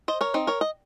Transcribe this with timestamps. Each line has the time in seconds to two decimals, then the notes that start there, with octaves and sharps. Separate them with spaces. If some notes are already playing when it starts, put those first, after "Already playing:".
0.08 C5 D#5
0.21 A#4 C#5
0.34 C4 D#4
0.47 A#4 C#5
0.61 D#5